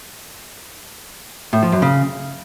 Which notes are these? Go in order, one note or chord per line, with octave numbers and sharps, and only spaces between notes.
A2
F3
F#2
C#3